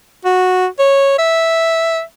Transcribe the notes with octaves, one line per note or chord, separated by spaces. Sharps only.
F#4
C#5
E5